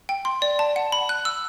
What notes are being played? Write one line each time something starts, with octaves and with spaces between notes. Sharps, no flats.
G5
C6
D5
A5
F#5
B5
F#6
E6